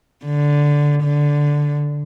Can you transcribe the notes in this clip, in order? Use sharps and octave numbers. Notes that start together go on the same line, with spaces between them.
D3
D3